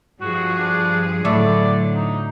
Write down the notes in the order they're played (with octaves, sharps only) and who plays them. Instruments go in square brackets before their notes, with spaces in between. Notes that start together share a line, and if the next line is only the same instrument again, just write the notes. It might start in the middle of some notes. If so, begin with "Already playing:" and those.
[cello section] G2 F3 G#4 [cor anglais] F#4
[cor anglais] D4
[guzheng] A2 A3 [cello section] D3 F#3 [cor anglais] D5
[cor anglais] D#4